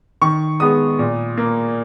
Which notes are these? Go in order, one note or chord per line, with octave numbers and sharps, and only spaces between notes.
D#3 C#6
G#3 B3 D#6
A#2
A#3